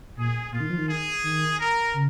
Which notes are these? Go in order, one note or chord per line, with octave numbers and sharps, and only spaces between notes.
A#2 G#4
A#2 F4
D#3
F3
D#3
G#4
D#3
A#4
C#3